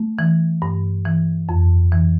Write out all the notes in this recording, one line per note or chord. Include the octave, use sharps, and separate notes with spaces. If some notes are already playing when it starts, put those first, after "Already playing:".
Already playing: A3
E3
G2
E3
F2
E3